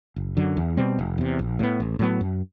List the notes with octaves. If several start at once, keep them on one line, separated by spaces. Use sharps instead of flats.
F#1
F#2 D3 F#3
E2
B2 G3 C4
F1
E2 C3
A#1
A2 F#3 B3
A1
A2 F#3 B3
F#2